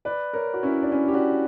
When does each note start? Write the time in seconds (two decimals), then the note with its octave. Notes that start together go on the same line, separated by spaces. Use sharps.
0.05 B4 D5
0.33 A#4 C#5
0.54 F#4
0.63 C#4 E4
0.82 D4
0.92 C#4 E4
1.08 G4
1.14 D4 F#4